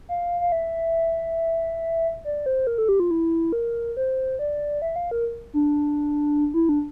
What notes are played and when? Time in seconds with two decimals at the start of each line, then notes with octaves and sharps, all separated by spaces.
0.09 F5
0.41 F5
0.52 E5
2.25 D5
2.46 C5
2.67 A#4
2.78 A4
2.89 G4
3.00 F4
3.11 E4
3.53 A#4
3.97 C5
4.39 D5
4.82 E5
4.96 F5
5.11 A#4
5.54 D4
6.54 E4
6.69 D4